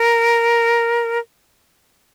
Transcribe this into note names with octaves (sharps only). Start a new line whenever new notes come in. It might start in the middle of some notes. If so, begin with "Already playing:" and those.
Already playing: A#4